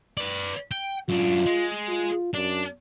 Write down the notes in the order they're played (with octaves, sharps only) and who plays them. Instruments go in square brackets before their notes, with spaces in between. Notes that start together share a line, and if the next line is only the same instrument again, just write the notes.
[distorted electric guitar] B4 D5
G5
[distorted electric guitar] F#2 D4 [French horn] F4
[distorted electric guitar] G#3
[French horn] F4
[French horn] F#2 [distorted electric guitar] D4